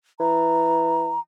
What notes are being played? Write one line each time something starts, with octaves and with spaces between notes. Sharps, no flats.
E3 A#5